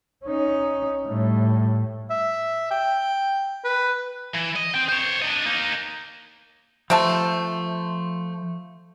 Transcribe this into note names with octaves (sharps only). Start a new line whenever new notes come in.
C#4 D#4
A2 G3
E5
G5
B4
E3
D#5
C4 G5
C5 C#5
D4 D#5
A#3 D#4
C3 F3 A3 C5 A5